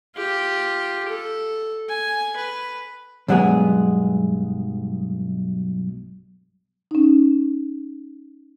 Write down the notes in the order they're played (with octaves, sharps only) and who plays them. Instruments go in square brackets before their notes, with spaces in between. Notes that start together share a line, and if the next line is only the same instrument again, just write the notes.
[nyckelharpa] F4 G4
A4
G#5
B4
[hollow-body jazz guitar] B1 G2 F#3 G#3 B3 G#4
[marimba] C#4 D#4